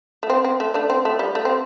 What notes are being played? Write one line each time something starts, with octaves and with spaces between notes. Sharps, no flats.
A3
C4
C4
A3
A3 D4
C4
A3
G3
A3
C4